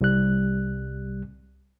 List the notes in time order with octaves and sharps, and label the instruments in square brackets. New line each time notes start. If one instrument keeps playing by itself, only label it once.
[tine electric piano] C2 G3 F#6